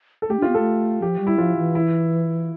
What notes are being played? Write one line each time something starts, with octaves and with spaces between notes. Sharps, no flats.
A4
A3 G4
D4 F4
B3
A3 A4
F3 G4
G3
E4
F3 F4
E3
E4